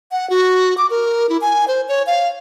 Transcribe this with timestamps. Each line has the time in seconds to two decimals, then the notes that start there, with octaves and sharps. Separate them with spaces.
0.12 F#5
0.30 F#4
0.78 D6
0.90 A#4
1.29 E4
1.41 G#5
1.68 C5
1.88 C#5
2.07 F5